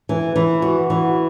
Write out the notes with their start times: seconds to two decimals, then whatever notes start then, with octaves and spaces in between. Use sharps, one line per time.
0.09 E3
0.36 E3
0.62 F#4
0.90 E3